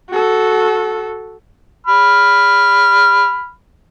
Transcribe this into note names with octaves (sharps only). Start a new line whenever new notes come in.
F#4 A4
B5 F6